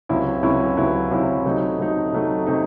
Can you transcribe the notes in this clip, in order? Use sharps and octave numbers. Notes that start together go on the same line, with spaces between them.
C#2 C3 F#3 C#4 E4
C#2 C3 F#3 C#4 E4
C#2 C3 F#3 C#4 E4
C#2 C3 F#3 C#4 E4
C3 F#3 A3 D#4
C3 F#3 A3 D#4
C3 F#3 A3 D#4
C3 F#3 A3 D#4